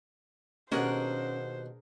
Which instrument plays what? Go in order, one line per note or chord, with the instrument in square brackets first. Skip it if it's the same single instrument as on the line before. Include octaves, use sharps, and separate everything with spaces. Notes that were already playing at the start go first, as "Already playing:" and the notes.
[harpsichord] D#2 B2 F#5 [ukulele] C#4 [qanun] D4 G#4 A#4 [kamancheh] C5